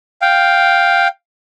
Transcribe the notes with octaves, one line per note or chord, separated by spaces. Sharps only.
F5 G5